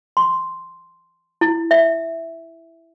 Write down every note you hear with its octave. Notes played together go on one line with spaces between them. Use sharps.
C6
E4
E5